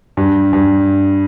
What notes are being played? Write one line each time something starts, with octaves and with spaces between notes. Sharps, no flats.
G2
G2